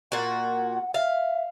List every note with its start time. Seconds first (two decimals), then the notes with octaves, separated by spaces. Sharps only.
0.12 A#2 F#4 F#5
0.94 E5 F5